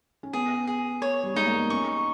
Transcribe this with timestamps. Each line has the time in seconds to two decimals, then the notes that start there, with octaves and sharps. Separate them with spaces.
0.23 C#4
0.33 B3 G#4
0.67 G#4
1.02 C#5
1.23 G3
1.35 G#3 D#4
1.46 A#3
1.59 B3
1.70 C#4 C#6